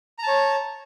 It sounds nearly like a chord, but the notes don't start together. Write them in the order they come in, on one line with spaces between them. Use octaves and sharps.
A#5 A5 C#5